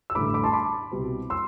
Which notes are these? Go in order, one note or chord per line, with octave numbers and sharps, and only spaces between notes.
E6
A1 G2 D3 A3 B5 D6
B5 D6
A5 C6
B5 D6
C2 B2 G3 C4
C6 E6